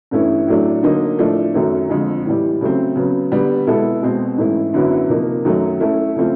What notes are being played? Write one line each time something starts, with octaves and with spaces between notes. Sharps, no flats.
G2 E3 A3 C#4 E4
A2 F#3 A3 D4
D3 F#3 A#3 D#4
A2 F3 A3 D4
F#2 D#3 F#3 A3
F2 D3 F3 G#3
A2 E3 G3
C#3 F#3 A3 C4
C#3 F#3 B3
D3 G3 B3
B2 G#3 B3 E4 A4
B2 G#3 C4
G#2 E3 A3 C#4 E4
F#2 D3 F#3 B3 E4
C3 F3 A#3 D#4
F#2 D#3 F#3 A3
A3 C#4 E4 A4
C#3 F3 A3 C4 F4